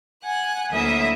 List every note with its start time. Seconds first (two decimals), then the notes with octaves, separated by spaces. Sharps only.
0.24 F#5 G#5 F#6
0.71 D2 F#3 A#3 E4 E5 D#6